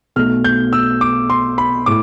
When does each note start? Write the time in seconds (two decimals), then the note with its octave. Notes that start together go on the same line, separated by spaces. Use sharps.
0.16 B1 B2 A3 F6
0.44 G6
0.73 E6
1.01 D6
1.30 C6
1.58 B5
1.86 A2 D6